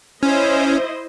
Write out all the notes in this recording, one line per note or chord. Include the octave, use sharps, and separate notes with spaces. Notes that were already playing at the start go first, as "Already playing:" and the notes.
C#4 E4 C5 D#5